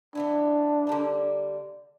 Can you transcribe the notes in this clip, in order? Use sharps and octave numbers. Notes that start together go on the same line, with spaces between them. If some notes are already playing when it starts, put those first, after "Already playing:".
E3 B3 D4 E4
D3 G3 A#3